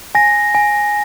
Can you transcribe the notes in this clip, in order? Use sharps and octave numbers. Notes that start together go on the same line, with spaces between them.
G#5 A#6
G#5